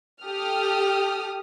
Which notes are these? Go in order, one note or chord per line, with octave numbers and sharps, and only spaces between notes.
G4 A4 D#6 F6